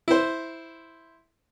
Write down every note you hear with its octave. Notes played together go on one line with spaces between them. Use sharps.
E4 C5